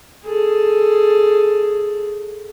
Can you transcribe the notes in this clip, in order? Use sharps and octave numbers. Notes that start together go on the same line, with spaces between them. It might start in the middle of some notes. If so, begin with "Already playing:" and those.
G#4 A4